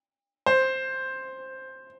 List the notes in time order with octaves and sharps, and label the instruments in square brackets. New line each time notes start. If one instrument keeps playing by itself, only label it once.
[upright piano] C5